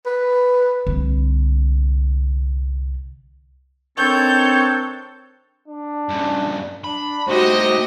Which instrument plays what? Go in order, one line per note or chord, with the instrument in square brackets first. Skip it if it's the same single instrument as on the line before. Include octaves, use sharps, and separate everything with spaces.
[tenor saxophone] B4
[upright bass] C2 D3
[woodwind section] D#3 D4 A4 [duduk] C4 [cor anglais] C#5 [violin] G6
[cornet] D4
[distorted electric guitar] G2 C#3
[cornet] D4 [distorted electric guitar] B5
[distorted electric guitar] A2 D#4 [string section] F#4 G4 D#5 [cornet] C5